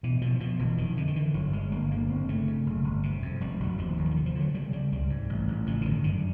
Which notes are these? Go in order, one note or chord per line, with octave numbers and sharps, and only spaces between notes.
B2 E3
B2 F3
B2 F3
F1 E3
F2 D#3
D3 E3
D#3
D3 E3
G1 F#3
G1 G#3
G1 A#3
D3 A#3
G1 C4
C#3 A3
C#3
F#1
G1
C3
F2
F1 G3
F1 F#3
D#2 F3
F1 D#3
E3
F3
D3
F3
D3
F#3
C#3 G3
C#3 G3
C#2 G3
G#2
A1
A1
C#3 F3
D3
G1 D#3
F#2 D3